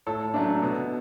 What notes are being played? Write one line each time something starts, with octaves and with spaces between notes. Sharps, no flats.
A2 A4 C#5
F#3 A3 D4
B2